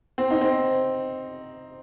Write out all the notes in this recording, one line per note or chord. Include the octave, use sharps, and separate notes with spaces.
C4
D#4
C4